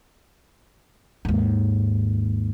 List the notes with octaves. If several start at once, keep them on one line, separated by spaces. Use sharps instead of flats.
D#2 G#2